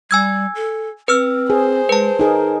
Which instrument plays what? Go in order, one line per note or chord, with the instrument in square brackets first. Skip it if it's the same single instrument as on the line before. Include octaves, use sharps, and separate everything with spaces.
[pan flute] G3 [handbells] G#5 E6 G#6
[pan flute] A4
[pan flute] C4 [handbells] B4 E6 F6
[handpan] G#4 [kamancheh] C5
[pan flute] G#3 [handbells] B4 A5
[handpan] D#4 G#4 [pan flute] A#4